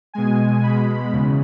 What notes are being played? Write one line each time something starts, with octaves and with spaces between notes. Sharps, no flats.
B2 G#3 G#5
B2 G#3 B5
E2 C#3